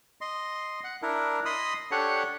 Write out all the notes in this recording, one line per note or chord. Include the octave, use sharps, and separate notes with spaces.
D#5 C6
F#5
D4 E4 A#4
D#5 B5 C6 D#6
D4 G4 A4 C#5 F#5